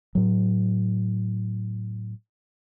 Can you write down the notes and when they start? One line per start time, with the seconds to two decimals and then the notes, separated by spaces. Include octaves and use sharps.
0.15 A2 F#3